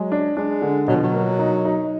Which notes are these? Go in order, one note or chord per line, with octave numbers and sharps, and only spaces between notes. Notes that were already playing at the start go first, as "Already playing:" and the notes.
Already playing: F#3 G#3
D4
G#3 D4
D3
B2 F#3
F3
F#3
A#3
D#4
D#4